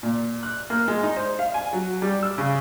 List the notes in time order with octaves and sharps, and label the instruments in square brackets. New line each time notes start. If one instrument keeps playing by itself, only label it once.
[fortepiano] A#2
F#6
A#3
G#3
D#4
C5
F5
G#5
F#3
G3
E6
C#3